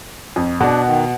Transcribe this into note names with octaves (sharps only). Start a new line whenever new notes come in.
F2
B2 D4 F#5
D#3